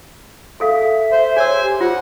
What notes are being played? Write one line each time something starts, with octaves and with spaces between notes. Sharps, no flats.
G#4 A4 E5 F5
C5
G#4 C5 C#5 G#5 E6
G4
F4 F#5